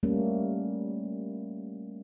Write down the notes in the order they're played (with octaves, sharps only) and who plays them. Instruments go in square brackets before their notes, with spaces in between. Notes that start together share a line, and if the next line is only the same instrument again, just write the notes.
[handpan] G3 A3 A#3 C#4